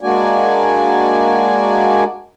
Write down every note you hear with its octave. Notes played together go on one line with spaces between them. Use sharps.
G#3 A#3 D4 F#4 D5 G#5